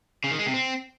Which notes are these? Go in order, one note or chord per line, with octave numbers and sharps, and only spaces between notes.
C#3
D#3
G#3
C3
C4